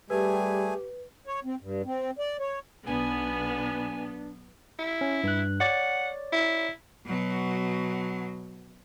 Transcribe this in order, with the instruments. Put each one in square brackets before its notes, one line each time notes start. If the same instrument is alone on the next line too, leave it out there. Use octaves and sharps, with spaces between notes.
[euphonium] G3 [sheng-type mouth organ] A3 G#4 G#5 [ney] G4 [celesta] B4
[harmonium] C#5
C4
G2
C4
D5
C#5
[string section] B1 B3 [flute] D4 [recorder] G#5
[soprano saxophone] E4
[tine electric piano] C#4
G2 F#6
[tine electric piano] C#5 D5 A6 [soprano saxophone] F#5
[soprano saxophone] E4
[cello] B2 F#3